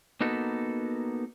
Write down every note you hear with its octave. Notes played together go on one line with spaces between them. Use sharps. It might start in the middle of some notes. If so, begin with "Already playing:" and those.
A#3 B3 D#4 F#4 A4